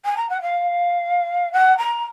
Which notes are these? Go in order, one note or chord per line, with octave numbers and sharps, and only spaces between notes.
G#5
A#5
F#5
F5
F#5
A#5